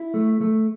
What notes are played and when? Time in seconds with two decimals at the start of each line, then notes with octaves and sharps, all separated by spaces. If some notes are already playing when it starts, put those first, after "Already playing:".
Already playing: E4
0.14 A3
0.41 A3